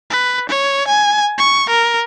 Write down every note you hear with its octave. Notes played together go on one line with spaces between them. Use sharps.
B4
C#5
G#5
C#6
A#4